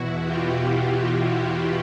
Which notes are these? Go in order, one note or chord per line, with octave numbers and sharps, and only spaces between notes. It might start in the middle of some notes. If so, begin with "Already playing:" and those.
Already playing: E2 B2 E4 F#4
F4 G4